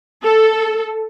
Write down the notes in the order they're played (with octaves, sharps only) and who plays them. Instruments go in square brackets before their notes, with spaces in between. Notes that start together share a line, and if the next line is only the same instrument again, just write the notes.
[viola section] A4